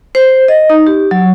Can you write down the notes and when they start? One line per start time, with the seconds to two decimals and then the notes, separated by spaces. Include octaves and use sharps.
0.15 C5
0.48 D#5
0.70 D#4
0.87 G4
1.11 F#3